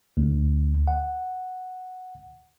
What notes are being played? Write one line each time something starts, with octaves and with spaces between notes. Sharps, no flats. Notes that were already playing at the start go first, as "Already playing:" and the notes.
D2
F#5